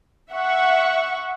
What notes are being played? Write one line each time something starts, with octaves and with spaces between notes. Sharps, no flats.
E5 F#5 C#6